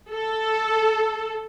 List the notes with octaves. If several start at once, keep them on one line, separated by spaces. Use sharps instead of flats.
A4